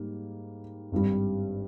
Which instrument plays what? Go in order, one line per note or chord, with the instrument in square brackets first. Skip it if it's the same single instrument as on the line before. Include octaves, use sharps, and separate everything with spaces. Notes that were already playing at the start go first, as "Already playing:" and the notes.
Already playing: [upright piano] G#2 G3 A#3
G#1 G2 G3